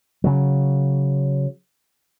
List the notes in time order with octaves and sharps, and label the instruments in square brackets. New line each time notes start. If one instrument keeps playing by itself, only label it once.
[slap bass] C#3 F#3